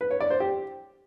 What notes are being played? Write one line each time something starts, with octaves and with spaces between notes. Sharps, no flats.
B4
C#5
D5
C5
G4